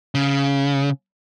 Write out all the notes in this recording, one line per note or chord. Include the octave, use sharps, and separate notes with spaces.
C#3